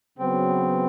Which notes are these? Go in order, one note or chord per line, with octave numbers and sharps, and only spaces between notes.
C#3 F#3 B3 C4